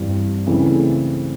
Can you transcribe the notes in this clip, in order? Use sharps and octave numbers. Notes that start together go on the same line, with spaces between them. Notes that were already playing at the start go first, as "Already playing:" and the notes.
Already playing: G2 E3 G3 C4 E4
C#3 E3 A3 C4